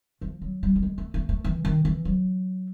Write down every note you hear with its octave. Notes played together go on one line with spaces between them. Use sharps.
F3
F#3
G3
G3
G#3
A3
A3
A3
E3
D#3
E3
F#3